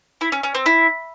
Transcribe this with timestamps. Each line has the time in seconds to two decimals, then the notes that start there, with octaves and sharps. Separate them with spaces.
0.21 E4
0.32 C#4
0.43 C#4
0.55 C4
0.66 E4